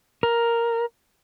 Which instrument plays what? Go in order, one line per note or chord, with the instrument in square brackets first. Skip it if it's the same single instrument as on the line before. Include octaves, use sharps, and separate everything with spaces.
[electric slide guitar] A#4